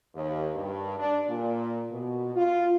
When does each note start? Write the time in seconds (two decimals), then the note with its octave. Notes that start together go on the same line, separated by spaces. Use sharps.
0.15 D#2
0.56 G2
0.98 D4
1.28 A#2
1.91 B2
2.35 F4